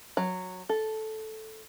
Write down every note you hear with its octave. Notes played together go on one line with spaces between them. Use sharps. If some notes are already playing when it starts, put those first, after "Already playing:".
F#3
A4